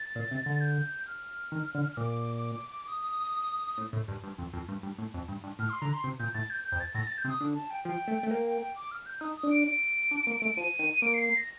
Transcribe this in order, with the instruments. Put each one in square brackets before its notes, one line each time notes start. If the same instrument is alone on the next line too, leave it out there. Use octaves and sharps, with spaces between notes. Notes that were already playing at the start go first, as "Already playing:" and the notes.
Already playing: [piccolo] A6
[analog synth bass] A#2
C3
D3
[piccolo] G6
F6
[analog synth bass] D#3
D3
[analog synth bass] A#2 [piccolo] D6
[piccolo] D#6
[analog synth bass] A2
A2
G2
G2
F2
F2
G2
G2
A2
F2
G2
G2
[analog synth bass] A2 [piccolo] F6
[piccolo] C6
[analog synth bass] D3 [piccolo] A#5
[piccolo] C6
[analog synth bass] C3
[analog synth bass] A#2 [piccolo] G6
[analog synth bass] A2 [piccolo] A6
[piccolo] G6
G6
[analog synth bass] F2
[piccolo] A6
[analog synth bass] A2 [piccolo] A#6
[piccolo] A6
G6
[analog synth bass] C3
[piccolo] D#6
[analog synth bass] D3
[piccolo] A5
G5
[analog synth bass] F3 [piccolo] G5
[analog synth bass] A3
A3
[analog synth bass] A#3 [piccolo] G5
[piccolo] G5
G5
D6
F6
G6
[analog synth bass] D#4 [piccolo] D#6
[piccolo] D#6
[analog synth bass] D4
[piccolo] D7
D7
[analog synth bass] D4
A#3
A3
[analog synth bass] F3 [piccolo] D#7
[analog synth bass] D#3
[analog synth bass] A#3 [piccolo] D7
[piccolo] C7
C7
A#6